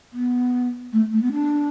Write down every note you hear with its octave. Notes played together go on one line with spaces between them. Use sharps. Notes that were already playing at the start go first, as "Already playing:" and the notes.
B3
A3
A3
B3
D4